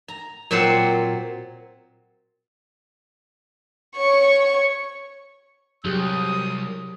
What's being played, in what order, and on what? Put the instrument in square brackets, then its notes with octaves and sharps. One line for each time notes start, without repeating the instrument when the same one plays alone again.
[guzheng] A#5
A#2 F#3 C4 C5 F#5 G5
[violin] C#5 C#6
[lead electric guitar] C2 [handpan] F#3 G4 G#4 [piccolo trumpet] D#6